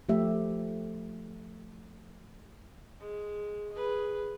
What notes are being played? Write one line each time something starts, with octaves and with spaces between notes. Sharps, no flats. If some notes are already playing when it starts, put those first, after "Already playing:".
F3 A3 G4 E5
G#3
G#4 B4